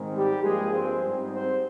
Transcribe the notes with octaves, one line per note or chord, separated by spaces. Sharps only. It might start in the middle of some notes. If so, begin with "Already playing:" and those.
Already playing: G#2 D#3 G#3 C4
G3 G4
G2 F3 G#3 A#3 G#4
C4 C5
G#2 G3 C4
C4 C5